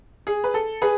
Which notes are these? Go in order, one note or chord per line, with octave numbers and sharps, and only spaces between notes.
G#4
B4
A4
G#4 B4